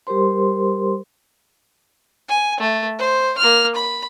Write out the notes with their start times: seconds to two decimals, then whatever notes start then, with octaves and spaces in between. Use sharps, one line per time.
0.07 G3 G4 A#4 C5 C6
2.29 G#5
2.60 A3
2.99 C5
3.38 A#3 F6
3.75 B5